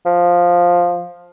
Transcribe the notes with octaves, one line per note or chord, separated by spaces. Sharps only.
F3